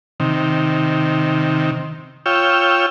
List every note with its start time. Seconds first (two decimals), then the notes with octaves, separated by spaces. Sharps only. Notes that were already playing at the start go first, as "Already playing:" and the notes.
0.20 C3 D#3
2.26 F4 C#5 G5 E6